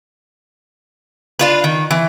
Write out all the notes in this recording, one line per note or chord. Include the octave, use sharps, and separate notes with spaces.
D4 F4 B4
D#3
E3